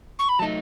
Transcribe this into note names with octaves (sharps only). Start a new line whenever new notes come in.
C#6
B5
F#3 A3 D#4 A5